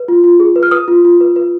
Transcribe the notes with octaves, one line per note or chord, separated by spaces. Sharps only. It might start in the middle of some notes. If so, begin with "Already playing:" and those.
Already playing: B4
F4
F4
G#4
B4
F6
B4 D#6
F4
F4
B4
B4